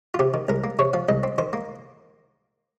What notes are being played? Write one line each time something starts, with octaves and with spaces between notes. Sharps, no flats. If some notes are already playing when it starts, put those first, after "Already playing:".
F4
C3 G4
D#3
C2 A#4
A#3
C3 C#5
F3 F5
C2 D#5
C4
D#3 C5
A#3